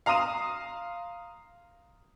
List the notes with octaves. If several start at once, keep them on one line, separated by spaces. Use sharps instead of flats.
F5 A#5 C6 D#6 D#7 E7